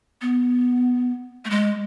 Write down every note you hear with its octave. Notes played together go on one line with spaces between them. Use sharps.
B3
A3
G#3